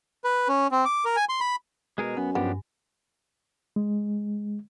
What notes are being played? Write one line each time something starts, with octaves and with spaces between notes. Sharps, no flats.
B4
C#4
C4
D6
A#4
G#5
C6
B5
B2 G#3 G#4 A#4
F#2 B3 G#5
G2 F3 B3 D4 G4
G#3